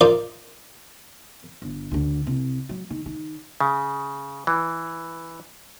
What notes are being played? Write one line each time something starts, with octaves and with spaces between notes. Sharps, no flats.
D#4 F4 A#4 C5 D5
G1
D2 D3
C2
F#3
D#3
D#3
C#3
E3